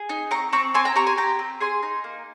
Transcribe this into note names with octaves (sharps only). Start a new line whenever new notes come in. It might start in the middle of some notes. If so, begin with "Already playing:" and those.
Already playing: G#4
D#4
C4 A#5 C#6
C4 A#5 C#6
C4 G#5 C6
G5 A#5
G4 A#5 C#6
G#5 C6
G4 G5 A#5
C4
G#4 G#5 C6
D#4
A#3